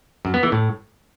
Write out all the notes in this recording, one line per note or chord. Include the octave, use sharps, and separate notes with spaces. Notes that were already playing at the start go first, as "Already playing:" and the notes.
F#2
B3
E3
A2